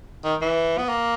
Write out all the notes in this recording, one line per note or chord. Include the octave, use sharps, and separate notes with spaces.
D#3
E3
B3
A#3